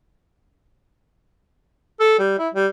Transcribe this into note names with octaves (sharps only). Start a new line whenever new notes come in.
A4
G3
E4
G3